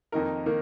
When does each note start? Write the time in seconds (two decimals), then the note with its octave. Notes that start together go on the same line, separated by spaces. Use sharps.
0.12 F2 D#3 A#3 D#4 A#4
0.46 D#3 A#3